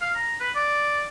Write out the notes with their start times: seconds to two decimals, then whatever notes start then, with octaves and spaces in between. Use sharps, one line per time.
0.01 F5
0.15 A#5
0.40 B4
0.55 D5